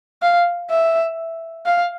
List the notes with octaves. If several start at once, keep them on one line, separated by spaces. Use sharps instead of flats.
F5
E5
F5